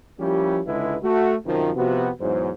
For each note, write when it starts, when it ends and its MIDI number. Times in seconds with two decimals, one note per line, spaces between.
0.20 0.61 53
0.20 0.61 55
0.20 0.61 58
0.20 0.61 61
0.20 0.61 64
0.20 0.61 67
0.67 0.96 37
0.67 0.96 50
0.67 0.96 56
0.67 0.96 64
0.67 0.96 71
1.03 1.36 57
1.03 1.36 66
1.46 1.71 42
1.46 1.71 48
1.46 1.71 51
1.46 1.71 53
1.76 2.10 48
1.76 2.10 53
1.76 2.10 59
1.76 2.10 66
2.20 2.51 40
2.20 2.51 44
2.20 2.51 54
2.20 2.51 72